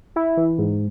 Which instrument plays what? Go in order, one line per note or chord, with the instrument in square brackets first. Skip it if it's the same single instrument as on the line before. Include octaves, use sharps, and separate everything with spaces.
[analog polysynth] E4
E3
G#2